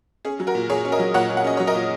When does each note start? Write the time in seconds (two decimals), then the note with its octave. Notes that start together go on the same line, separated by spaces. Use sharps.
0.25 C#4 G#4
0.40 F#3
0.47 F#4 A#4
0.55 A#2
0.70 A#2 G#4 C#5
0.85 C#4
0.92 A#4 D#5
0.99 F#3
1.14 A#2 C#5 F#5
1.30 A#2
1.37 F#5
1.44 C#4 D#5
1.57 F#3 C#5
1.67 A#4 D#5
1.75 A#2